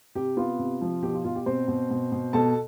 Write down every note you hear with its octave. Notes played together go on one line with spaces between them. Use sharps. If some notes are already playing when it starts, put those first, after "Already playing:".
C3 G4
B3 F4
C3
F3
B2 G4
F4
B2 F4
G4
B2 C4 C5
B2
B2
B2
B2 A4 A5